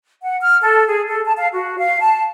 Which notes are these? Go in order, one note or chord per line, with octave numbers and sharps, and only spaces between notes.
F#5
F6
A4
G#4
A4
A5
F5
F#4
F5
A5